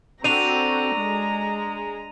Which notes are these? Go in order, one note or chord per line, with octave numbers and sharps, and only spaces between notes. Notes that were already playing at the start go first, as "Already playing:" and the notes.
C4 D4 F#4 A4 A#5 D#7 F7
G#3